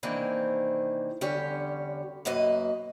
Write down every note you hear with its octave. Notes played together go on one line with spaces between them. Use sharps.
C3 D#3 E3 A#3 C4 D4
E2 D3 G3 C#4 G4 C#5
F#2 B2 A#3 B4 D#5